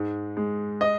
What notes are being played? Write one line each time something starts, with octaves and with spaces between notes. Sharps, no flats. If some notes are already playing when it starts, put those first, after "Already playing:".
Already playing: G#2 G#3
G#3
D#5